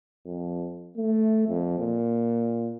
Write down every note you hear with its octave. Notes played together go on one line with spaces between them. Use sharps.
F2
A3
F2
A#2